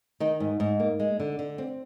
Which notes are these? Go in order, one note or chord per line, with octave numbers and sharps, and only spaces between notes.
D#3 D#4
G#2
G#2
A#3
G#3
D3
D3
C4